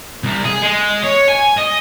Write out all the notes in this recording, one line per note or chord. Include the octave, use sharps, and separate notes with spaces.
C2
G#4
G#3
C#5
G#5
D#5